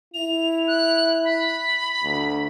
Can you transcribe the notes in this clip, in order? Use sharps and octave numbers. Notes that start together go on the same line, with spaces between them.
E4 F7
F#6
B5
D2